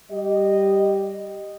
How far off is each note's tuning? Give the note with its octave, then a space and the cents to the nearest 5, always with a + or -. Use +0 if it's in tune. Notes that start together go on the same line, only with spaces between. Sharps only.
G3 +0 G4 -5 D#5 -10